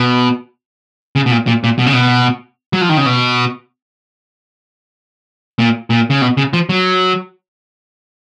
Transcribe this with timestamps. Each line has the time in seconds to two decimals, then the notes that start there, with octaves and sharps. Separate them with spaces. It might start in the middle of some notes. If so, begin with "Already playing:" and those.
Already playing: B2
1.16 C#3
1.26 B2
1.31 A#2
1.47 A#2
1.64 A#2
1.79 B2
1.86 C#3
1.93 B2
2.73 F#3
2.81 F3
2.89 D#3
2.97 C#3
3.06 B2
5.59 A#2
5.90 A#2
6.10 C#3
6.22 B2
6.37 C#3
6.53 F3
6.69 F#3